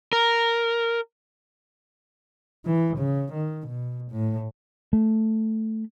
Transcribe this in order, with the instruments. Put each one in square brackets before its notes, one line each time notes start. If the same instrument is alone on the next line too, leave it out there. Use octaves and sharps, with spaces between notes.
[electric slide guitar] A#4
[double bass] E3
C#3
D#3
B2
A2
[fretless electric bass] A3